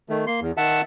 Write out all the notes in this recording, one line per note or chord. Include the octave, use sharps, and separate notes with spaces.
D#3 A3
A#3 C6
E2
D#3 E5 F#5 A5